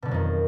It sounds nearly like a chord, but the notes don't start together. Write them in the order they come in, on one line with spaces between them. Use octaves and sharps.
B2 D3 F#3 F2 D#3